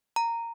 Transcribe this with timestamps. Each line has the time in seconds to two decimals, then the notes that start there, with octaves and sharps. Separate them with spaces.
0.16 A#5